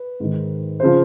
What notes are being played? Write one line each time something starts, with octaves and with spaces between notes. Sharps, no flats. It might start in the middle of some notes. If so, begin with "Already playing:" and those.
Already playing: B4
G#2 D#3
C#3 F3 C5